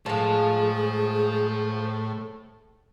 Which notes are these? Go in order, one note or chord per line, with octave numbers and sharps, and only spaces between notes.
A2 G#3 G#4 C5 F5 A5